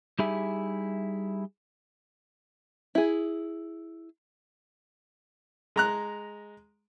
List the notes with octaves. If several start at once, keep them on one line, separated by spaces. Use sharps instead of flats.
G3 D#4 E4 G4 G#4 E5
E4 G#4
G#3 A#5 F#6